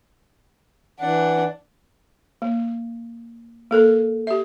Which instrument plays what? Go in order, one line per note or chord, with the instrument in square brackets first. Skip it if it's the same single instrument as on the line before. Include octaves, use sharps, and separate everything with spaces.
[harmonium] E3 F#5 [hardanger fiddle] D4
[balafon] A#3
A#3 A4 A#4
G4 E5